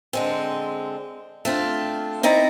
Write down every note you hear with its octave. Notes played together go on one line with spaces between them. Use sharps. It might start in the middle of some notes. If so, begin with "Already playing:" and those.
D3 G#3 C4
A3 C4 D4 F4
C4 D#4 E4 D5 A#5